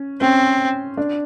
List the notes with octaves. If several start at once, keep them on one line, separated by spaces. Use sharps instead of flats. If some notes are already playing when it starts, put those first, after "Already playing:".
Already playing: C#4
C4 C#4
D4